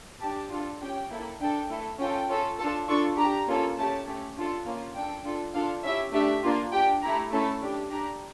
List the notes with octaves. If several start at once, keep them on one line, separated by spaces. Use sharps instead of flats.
D4 G4 A5
D4 F4 A4
C#4 G4 G5
A#3 E4 A4
D4 A4 G5
A3 E4 A4
C#4 F4 A4 G5
C#4 F4 A4
D4 F4 A4 A5
D4 F4 A4 C#6
D4 G4 A#5
A#3 C#4 F4 A4
A3 C#4 G4 A5
A3 C#4 G4
D4 F4 A4
A#3 C#4 F4 F5
D4 A4 G5
D4 F4 A4
D4 F4 A4 F5
C#4 E4 G4 E5
A3 D4 G4 E5
A#3 D4 F4
D4 G4 G5
A3 E4 G4 A#5
A3 C#4 E4 A4 A5
D4 G4
D4 G4 A#5